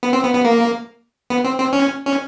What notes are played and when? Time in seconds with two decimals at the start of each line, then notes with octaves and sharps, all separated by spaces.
0.03 B3
0.13 C4
0.23 B3
0.34 B3
0.45 A#3
1.30 B3
1.44 C4
1.59 C4
1.73 C#4
2.06 C#4